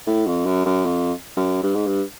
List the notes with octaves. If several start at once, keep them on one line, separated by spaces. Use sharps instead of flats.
A2
F2
F#2
F#2
F2
F#2
G2
G#2
G2